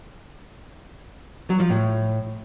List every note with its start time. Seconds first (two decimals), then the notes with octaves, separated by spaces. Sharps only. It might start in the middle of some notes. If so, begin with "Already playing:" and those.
1.50 F#3
1.60 F3
1.70 A2